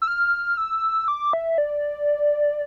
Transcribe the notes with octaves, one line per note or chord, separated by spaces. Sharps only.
E6
F6
E6
D6
E5
D5